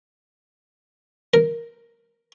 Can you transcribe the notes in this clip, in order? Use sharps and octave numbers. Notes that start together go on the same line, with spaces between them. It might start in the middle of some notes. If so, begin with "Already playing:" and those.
A#4